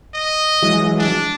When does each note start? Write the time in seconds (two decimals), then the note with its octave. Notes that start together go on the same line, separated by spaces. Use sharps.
0.14 D#5
0.62 E3 F#3 G#3
0.99 D4